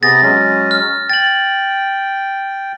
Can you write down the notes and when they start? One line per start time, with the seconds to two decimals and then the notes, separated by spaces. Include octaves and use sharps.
0.03 C3 B3 G#4 A6 A#6
0.22 F#3 G#3 C#4
0.71 F6
1.10 G5 A6 F#7